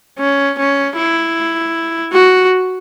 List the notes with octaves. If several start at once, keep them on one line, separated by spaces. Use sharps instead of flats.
C#4
C#4
E4
F#4